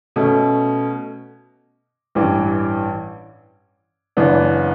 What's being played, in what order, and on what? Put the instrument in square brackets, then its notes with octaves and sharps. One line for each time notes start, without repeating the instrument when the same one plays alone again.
[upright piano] B2 A3 C#4
A1 G2 E3
F#1 F#2 E3 B3 D4